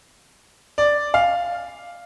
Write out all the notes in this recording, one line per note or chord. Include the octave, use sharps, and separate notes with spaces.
D5
F5